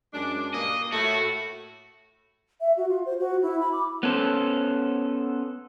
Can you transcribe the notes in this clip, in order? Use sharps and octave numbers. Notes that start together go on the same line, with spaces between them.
F#2 G#3 D4
G2 A#2 A#3 D#5
A2 A3 F#4
E5
F#4
F4
C5
F#4
E4
B5
D6
B3 C#4 A4 C5